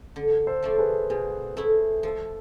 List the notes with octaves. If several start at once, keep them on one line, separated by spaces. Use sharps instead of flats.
D3
A4 C5
F3 A3 D4
G#4 B4
B2 G#4
A3 E4 A4
F3 A4